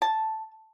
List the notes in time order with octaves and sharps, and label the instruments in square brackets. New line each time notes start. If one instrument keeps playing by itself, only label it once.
[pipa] A5